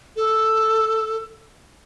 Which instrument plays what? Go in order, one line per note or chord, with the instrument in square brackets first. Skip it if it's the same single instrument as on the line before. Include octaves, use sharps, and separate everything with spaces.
[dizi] A4